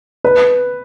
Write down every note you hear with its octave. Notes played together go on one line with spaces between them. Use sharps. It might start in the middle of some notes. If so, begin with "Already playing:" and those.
B4